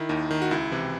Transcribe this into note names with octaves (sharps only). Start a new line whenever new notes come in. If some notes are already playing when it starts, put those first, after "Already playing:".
Already playing: D#3 E4
D#2 D#4
D#3
F#4
C#2 E4
C3 E3